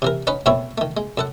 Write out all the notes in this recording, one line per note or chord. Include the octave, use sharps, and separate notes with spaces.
C3 E3 A#4
C#4 D#4 B4 F#5
F#2 B2 A3 C4 E4 C#5
D#3 A3
G#3
F#2 A4 F#5